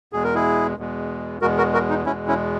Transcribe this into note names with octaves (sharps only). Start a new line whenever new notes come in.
E2 B2 G#3 G#4
A#4
E4 G#4
E2 B2 G#3
E2 B2 G#3 F#4 A#4
F#4 A#4
F#4 A#4
D#4
E2 B2 G#3 C#4 E4
C#4 E4